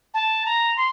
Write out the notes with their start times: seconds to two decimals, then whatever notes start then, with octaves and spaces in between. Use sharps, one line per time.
0.14 A5
0.46 A#5
0.77 C6